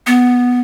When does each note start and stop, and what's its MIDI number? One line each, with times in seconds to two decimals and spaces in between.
0.07 0.60 59